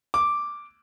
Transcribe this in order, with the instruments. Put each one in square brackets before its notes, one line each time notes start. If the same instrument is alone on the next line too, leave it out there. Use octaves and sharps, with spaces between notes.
[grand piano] D6